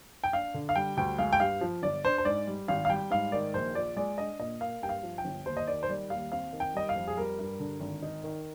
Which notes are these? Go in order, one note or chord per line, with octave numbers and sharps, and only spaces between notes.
G5
D4 F5
D3
F5
G3 G5
D2 G5
G#3 F5
G5
G2 F5
F3
G1 D5
D4 C5
C5
G#2 D5
G3
G#1 F5
F5
G3 G5
G#2 F5
D#3 D5
A#1 C5
F4 D5
G#3 D5
D4 D#5
A#2 D#5
A#3 F5
G2 G5
F5
F3
G5
G1
D#2 C5
D#5
D#3 D5
C5
G3 D5
D#2 F5
C4 F5
D#3
G5
G3 D#5
F5
F2
G#4
G3 A#4
G2
D3
G#1
D#4
D#3